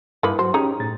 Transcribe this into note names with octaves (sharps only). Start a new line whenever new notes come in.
G2 D#3 A#3 E4 B4
F#3 F#4 C5
C#4 D#4 G4 G#4 A#5
A2 A6